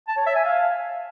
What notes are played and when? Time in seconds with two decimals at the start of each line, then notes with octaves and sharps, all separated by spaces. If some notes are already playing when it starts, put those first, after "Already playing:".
0.08 A5
0.17 C#5
0.27 E5
0.36 G#5
0.45 F5